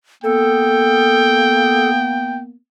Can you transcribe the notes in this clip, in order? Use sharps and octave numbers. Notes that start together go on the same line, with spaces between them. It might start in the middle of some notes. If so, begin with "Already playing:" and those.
A#3 B3 A4 G5